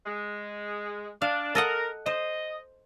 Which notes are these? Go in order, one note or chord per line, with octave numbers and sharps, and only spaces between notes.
G#3
D4 F5
A4 A#4 D#5 F#5
C5 D#5